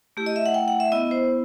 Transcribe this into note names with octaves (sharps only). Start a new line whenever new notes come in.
A3 E4 G4
D#5
E5
F#5
G5
F#5
E5
B3 E4 D#5
C5